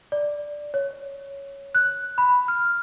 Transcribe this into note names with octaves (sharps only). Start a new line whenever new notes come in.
D5
C#5
F#6
B5
F6